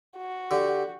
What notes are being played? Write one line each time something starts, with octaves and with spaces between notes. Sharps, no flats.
F#4
D3 G4